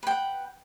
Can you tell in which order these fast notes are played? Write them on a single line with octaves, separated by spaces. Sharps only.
B4 G5 F#5